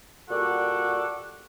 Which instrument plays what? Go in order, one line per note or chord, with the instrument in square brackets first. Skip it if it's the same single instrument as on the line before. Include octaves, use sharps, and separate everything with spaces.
[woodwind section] A#2 G3 F#4 A4 F#5 D6